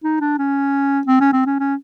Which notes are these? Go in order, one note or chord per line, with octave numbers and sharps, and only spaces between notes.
D#4
D4
C#4
C4
C#4
C4
C#4
C#4